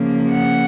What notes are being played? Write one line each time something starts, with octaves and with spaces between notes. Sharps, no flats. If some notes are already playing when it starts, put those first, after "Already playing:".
Already playing: C#3 F3 A#3
F#5